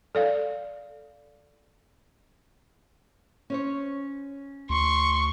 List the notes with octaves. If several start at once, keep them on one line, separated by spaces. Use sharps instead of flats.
A4 D5 F5
C#4 C5 C#5
D2 C6 C#6